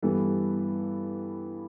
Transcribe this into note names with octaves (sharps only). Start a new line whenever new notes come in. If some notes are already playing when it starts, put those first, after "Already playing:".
G2 E3 G3 B3 A4